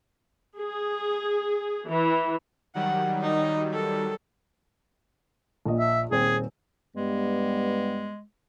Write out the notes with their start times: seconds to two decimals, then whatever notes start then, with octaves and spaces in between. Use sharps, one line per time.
0.56 G#4
1.88 E3
2.75 D#3 F#3 G3 F#5
3.21 D#4
3.73 A4
5.66 A#1 A#2 D#5
5.79 E5
6.11 D#1 C4 G#4
6.96 G2 G3 G#3 B3